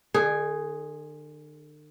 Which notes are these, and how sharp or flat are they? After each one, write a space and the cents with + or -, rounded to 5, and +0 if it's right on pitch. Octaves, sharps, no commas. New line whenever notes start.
D3 +45 G#4 +0